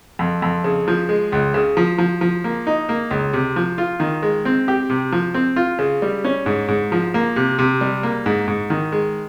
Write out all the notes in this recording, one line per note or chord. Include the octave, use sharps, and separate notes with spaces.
F2
F2
C#3
F3
G#3
C#2
C#3
F3
F3
F3
A#3
D#4
A#3
C#2
C3
F3
F4
D#3
G#3
C4
G4
C3
F3
C4
F4
C#3
G3
C#4
G#2
G#2
F3
A#3
C3
C3
G3
A#3
G#2
G#2
D#3
G#3